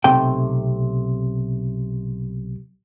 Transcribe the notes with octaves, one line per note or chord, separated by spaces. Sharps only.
B1 C3 A3 G5